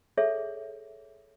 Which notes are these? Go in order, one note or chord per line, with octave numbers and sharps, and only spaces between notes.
G#4 A4 C#5 E5